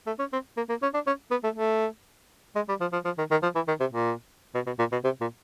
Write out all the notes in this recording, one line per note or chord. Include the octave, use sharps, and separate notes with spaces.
A3
C#4
C4
A#3
A#3
C#4
D4
C#4
B3
A3
A3
G#3
G3
F3
F3
F3
D#3
D#3
F3
E3
D#3
C3
A#2
B2
B2
A#2
B2
C3
A#2